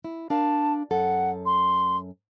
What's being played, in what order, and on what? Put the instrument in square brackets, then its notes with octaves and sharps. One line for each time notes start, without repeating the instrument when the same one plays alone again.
[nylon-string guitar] E4
[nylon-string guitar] D4 A#4 F5 [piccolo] A5
[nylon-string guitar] F#2 A4 [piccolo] F#5
[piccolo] C6